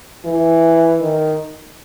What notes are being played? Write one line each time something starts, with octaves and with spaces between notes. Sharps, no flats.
E3
D#3